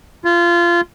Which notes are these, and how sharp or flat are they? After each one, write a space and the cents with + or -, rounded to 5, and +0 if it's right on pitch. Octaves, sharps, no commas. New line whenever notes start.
F4 -25